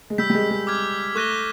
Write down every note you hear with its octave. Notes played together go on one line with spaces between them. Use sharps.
G#3
G3 E6 G6 B6
G3
G#3
G#3
D6 F6 G#6
A3 C#6 F#6 A#6 D#7 G7